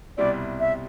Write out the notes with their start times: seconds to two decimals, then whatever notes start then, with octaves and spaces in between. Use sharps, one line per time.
0.18 C2 B2 G3 C4 E4 D5
0.60 E5